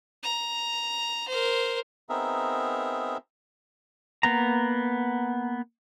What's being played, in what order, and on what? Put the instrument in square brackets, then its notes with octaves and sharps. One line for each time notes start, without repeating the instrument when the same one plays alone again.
[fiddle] A#5
A#4 C5
[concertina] B3 C4 D#4 G#4 A#4 E5
[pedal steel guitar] A#3 B3 A#5